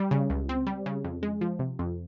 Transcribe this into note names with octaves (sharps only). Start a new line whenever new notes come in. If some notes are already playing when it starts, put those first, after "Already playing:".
Already playing: G3
C#3
C#2
C4
G3
C#3
F2
G#3
F3
C3
F2